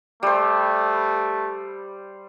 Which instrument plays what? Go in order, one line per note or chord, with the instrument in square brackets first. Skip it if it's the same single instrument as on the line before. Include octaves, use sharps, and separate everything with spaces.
[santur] G3 C5 [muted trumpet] A3